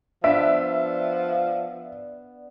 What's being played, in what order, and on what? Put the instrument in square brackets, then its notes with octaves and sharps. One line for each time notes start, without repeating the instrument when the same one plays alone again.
[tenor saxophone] F3 [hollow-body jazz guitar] B3 D4 B4 [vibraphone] D5 [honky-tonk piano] E5